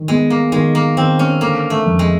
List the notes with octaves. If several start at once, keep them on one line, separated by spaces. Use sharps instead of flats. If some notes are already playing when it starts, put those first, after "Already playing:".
Already playing: D#3
G#3 B3
A#3
D#3 G#3
A#3
D#3 C4
C#4
D3 A#3
A3
F2
G#3